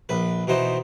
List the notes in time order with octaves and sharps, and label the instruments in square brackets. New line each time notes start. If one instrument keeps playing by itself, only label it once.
[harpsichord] A#1 B4
B2 E3 D#4 C5